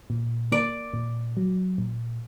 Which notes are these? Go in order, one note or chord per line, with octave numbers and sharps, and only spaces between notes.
A#2
A#3 D5
A#2
F#3
A#2